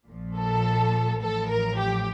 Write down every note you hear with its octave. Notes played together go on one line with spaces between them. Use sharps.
A#1 A#2 F3
A4
A1 A2 F3 A4
A#4
G4